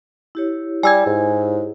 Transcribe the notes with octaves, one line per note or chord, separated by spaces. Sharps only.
E4 G4 C#5
G3 G#5 E6 G#6
G#2